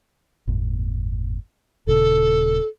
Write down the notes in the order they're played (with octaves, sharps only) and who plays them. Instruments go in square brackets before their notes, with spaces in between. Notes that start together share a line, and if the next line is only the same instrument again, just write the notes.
[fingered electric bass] G1 E2 A2
[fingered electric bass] D#1 A#2 C#3 [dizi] A4